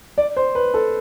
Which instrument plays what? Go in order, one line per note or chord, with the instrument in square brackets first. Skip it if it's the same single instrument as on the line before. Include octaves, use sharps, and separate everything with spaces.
[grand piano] D5
C5
B4
A4